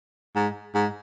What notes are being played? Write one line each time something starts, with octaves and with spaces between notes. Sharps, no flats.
G#2
G#2